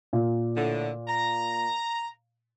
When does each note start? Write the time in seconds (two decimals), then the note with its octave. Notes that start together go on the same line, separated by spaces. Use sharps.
0.13 A#2
0.56 A2 D3
1.08 A#5